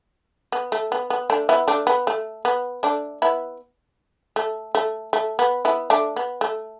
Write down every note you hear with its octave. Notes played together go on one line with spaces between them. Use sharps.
B3
A3
B3
B3
A3 D4
B3 E4
A3 D4
B3
A3
B3
A3 D4
B3 E4
A3
A3
A3
B3
B3 E4
A3 D4
B3
A3